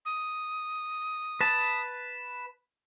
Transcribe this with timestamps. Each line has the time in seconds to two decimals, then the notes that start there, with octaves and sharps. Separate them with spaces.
0.06 D#6
1.41 B4 A5